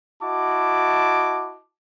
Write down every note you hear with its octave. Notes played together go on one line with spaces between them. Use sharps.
E4 F#4 D#5 A5 D6